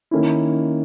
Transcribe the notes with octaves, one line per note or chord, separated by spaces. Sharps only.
D#3 A#3 C#4 E4